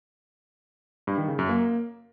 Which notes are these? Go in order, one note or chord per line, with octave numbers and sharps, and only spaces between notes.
G2
D#3
C#3
F#2
A#3